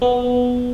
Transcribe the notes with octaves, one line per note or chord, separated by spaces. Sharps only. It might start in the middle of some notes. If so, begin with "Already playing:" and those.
B3